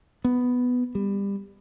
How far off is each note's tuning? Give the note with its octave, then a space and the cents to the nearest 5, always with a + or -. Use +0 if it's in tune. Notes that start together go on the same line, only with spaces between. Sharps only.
B3 +5
G3 +25